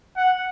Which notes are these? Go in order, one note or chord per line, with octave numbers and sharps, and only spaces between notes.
F#5